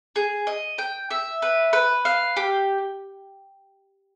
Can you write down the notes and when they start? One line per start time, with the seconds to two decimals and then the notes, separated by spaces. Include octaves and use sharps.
0.16 G#4
0.47 D#5
0.78 G5
1.11 E5
1.42 B4
1.73 B4
2.05 F5
2.37 G4